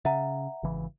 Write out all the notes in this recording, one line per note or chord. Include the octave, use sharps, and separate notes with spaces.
C#3 E5 F#5 A#5
G#1 C#3 E3